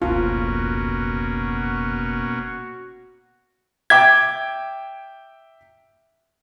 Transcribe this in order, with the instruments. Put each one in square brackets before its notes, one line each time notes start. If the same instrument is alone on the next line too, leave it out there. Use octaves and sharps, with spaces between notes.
[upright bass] F1 C#2 [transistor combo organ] B2 A#3 C#4 [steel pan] F4 [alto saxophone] F#4
[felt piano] E5 G5 D6 [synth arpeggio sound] G#6